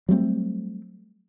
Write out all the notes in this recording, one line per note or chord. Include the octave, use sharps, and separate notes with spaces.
F#3 G3 A3 C4